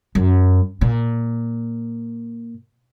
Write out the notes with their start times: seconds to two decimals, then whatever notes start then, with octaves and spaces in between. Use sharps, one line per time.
0.15 F#2
0.81 A#2